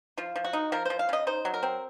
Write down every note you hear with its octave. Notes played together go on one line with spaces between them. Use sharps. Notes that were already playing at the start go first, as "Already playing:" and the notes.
F3 F4
F3
F#4
D#4
F3 A#4
F3 C5
F5
C#3 D#5
D#4 C5
F#3
A#4
C4